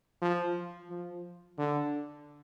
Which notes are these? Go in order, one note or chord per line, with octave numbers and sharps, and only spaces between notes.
F3
F3
D3